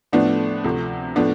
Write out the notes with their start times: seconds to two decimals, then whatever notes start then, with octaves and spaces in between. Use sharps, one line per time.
0.13 A2 F3 A3 B3 D4
0.64 D2 C3 F3 A3
1.15 A2 F3 A3 B3 D4